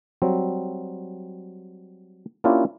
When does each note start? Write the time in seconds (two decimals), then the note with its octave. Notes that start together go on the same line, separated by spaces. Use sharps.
0.22 F#3 G3 C4
2.44 A#3 C#4 D4 E4 F4 G4